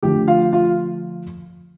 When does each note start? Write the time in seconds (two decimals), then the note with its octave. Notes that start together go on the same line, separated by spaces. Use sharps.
0.03 D3 F3 A3 G4 G5
0.28 F4 F5
0.53 F4 F5